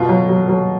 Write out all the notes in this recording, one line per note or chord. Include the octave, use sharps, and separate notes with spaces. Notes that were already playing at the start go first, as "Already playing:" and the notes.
Already playing: B2 F4
F#3
F#3
F#3